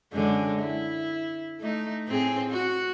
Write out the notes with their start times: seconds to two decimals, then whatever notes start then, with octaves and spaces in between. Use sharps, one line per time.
0.13 F#2 D3 G#3
0.61 E4
1.60 A3 D#4
2.07 A2 C4 G#4
2.50 F#4